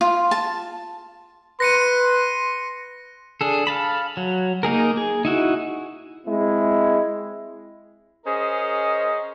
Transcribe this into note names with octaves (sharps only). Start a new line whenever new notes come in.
F4
A5
B4 C6 A#6 C#7 D#7
D4 G#4 A4
F5 A5 B5
F#3
A#3 D#4 G#4 A#4
G#4
D#4 E4 F#4
G#3 C4 E4
C#4 G#4 A#4 C5 D#5